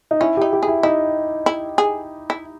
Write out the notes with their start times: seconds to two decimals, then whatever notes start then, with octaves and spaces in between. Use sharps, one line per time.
0.11 D#4
0.21 C#4 E4
0.37 D#4 G4
0.53 G4
0.63 E4 G#4
0.83 D#4 E4
1.46 E4
1.78 G#4
2.30 E4